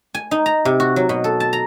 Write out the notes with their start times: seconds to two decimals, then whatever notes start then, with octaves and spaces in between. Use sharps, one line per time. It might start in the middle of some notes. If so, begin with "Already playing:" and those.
0.14 G#5
0.31 D#4
0.46 A#5
0.65 C3
0.80 F#4
0.96 F#3
1.09 B2
1.24 A4
1.40 A5
1.53 A#5